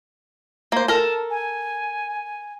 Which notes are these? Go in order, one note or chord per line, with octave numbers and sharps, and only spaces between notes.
A#3 C5
A4 A#4 A5
G#5